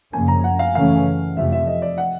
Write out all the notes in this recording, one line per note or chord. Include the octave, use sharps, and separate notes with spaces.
F#2 C#3 F3 A#3 C#4 G#5
A#5
F#5
F5
F#2 C#3 E3 A3 C#4 F5
F2 C3 F3 A3 E5
E5
D#5
D5
F#5